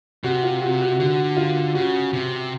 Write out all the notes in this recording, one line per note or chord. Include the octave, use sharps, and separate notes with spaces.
C3 F#4
F4
F#4
F#4
D3 F#4
F4
C#3 F#4
C3